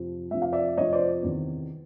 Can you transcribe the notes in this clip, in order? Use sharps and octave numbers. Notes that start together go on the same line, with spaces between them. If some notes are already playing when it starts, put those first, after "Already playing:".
Already playing: F2 C3 F3
F2 C3 F3 E5
F5
D5 E5
F2 C3 F3 C#5 D#5
C5 D5
E2 C3 D#3